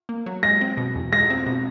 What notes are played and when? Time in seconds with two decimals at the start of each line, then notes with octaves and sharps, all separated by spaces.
0.09 A#3
0.26 F#3
0.43 G#3 A#6
0.61 C4
0.77 B2
0.95 E2
1.12 G#3 A#6
1.30 C4
1.47 B2